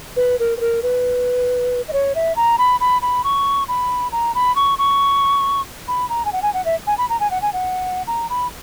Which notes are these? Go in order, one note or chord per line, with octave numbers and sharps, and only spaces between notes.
B4
A#4
B4
A#4
B4
D#5
C#5
E5
A#5
B5
B5
B5
C#6
B5
A#5
B5
C#6
C#6
B5
A#5
G#5
F#5
G#5
F#5
E5
G#5
B5
A#5
G#5
F#5
G#5
F#5
A#5
B5